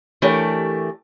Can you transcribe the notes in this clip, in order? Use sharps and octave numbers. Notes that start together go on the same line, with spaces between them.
E3 A3 D4 G4 A#4 C#5